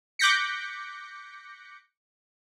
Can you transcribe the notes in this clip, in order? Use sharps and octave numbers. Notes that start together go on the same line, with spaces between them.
D6 F#6 G6 A#6 B6 C#7